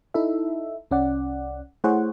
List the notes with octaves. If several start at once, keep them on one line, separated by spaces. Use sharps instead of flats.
D#4 E4 A4 E5
C2 C#4 D5 F#5
A3 E4 G#4 C5 C#5 F#5